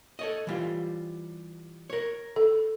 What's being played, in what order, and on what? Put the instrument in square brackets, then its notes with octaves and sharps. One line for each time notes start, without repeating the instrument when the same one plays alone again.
[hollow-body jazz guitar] A4 C#5 D#5
E3 G3 F4
A#4 C#5
[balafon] A4